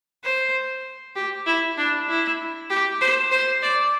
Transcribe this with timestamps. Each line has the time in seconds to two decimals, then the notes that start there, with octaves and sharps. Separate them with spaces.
0.24 C5
1.16 G4
1.46 E4
1.77 D4
2.09 E4
2.70 G4
3.01 C5
3.31 C5
3.62 D5